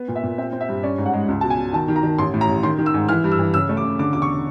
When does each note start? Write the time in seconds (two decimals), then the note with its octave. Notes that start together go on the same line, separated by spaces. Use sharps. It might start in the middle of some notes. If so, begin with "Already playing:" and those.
Already playing: B3
0.08 A#2
0.16 E5
0.24 A#2
0.38 C4 E5
0.53 C4
0.61 E5
0.68 G2
0.83 C#4 D5
0.98 G#2
1.06 F#5
1.13 G#3
1.28 C#2
1.41 B2 A5
1.50 G#5
1.58 B2
1.73 D#3 A5
1.88 D#3
1.96 A#5
2.03 D#3
2.18 A1 C6
2.34 A2
2.41 A#5
2.48 A1
2.63 D#3 C6
2.79 D#3
2.86 E6
2.94 G#2
3.09 E3 F6
3.24 G2
3.31 E6
3.39 E3
3.54 C#3 E6
3.69 A3
3.77 D6
3.84 C#3
3.99 D3 D6
4.13 E1 D6
4.22 C#6